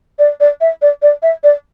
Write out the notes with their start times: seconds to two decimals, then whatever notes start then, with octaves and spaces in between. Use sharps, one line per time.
0.19 D5
0.40 D5
0.61 E5
0.82 D5
1.02 D5
1.23 E5
1.44 D5